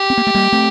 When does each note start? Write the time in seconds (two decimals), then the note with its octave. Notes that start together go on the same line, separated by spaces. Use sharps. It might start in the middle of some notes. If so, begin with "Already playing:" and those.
Already playing: G4
0.10 C4
0.17 A#3
0.27 A3
0.35 G3 A#3
0.52 A3 C4